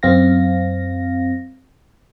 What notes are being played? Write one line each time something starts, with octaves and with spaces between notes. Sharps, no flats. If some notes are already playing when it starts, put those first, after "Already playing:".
F#2 C4 F5 A#6